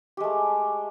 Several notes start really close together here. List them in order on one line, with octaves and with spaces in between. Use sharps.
G4 G#3 A3